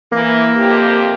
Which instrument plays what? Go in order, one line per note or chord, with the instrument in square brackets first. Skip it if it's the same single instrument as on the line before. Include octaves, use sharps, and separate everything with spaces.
[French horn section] E3 [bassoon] A#3
[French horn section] F2 C3 G4